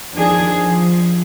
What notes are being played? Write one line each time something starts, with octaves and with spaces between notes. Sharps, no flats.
D#3 F3 D4 G#4
F3